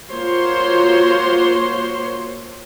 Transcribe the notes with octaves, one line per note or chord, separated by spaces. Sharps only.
A#3 F4 F#4 C5 C#5 C6